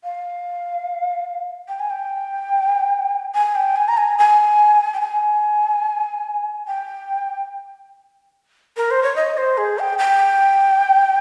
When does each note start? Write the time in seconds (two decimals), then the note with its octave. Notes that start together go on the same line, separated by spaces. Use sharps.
0.04 F5
1.68 G5
1.80 G#5
1.90 G5
3.34 G#5
3.55 G5
3.76 G#5
3.88 A#5
3.98 G#5
4.19 G#5
4.94 G5
5.01 G#5
6.67 G5
8.77 A#4
8.91 C5
9.03 C#5
9.16 D#5
9.37 C5
9.58 G#4
9.79 G5
9.99 G5